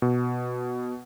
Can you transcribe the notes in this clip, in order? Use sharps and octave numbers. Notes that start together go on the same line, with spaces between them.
B2